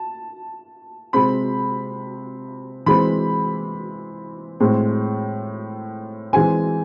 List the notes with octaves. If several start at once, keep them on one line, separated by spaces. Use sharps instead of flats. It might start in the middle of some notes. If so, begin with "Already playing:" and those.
Already playing: A5
C3 G#3 C4 B5
E3 G#3 C4 B5
A2 G#3 C4
E3 G#3 C4 G#5